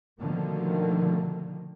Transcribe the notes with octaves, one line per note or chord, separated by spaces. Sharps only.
B2 D3 D#3 F3 A3 A#3